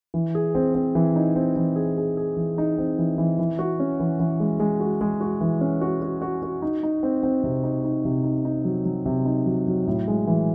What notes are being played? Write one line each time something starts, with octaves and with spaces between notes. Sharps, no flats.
E3
G#4
C4
C4
E3
D#4
C4
E3
G#4
G#4
G#4
E3
D#4
C4
E3
E3
E3
F#4
C#4
E3
E3
G#3
G#3
F#4
G#3
F#4
E3
C#4
F#4
F#4
F#4
F#4
D#4
D#4
C4
C4
C3
D#4
D#4
C3
D#4
D#4
F#3
F#3
C3
D#4
F#3
F#3
A2
G#3
E3